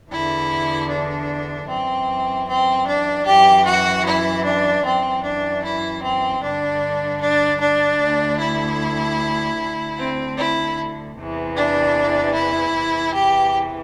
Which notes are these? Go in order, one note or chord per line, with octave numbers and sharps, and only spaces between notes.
E2 D3 E4
D4
F#2 E3 C4
C4
D4
F#2 E3 G4
F#4
E4
D4
F#2 E3 C4
D4
E4
C4
G2 D3 D4
D4
D4
D2 D3
E4
D2 D3
C4
E4
E2 C3 E3
D4
E4
E2 C3 E3
G4